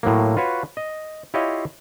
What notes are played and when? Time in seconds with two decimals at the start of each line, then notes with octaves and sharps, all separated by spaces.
0.03 A2 F#3 A#3
0.37 F4 F#4 B4 C#5
0.77 D#5
1.34 E4 F4 G4 C#5 D#5 F5